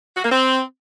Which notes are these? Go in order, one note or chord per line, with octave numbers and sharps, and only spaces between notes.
F#4
A#3
C4